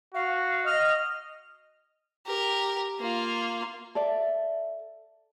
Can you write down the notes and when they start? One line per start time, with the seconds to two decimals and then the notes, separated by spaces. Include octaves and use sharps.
0.14 F#4 F5
0.65 D#5 F6
2.27 G4 A#4
3.00 A#3 F4
3.95 A4 D5 E5